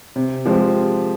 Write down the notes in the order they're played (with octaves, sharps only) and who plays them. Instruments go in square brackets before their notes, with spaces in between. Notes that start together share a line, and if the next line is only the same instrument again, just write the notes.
[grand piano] C3
F3 G#3 C4 G4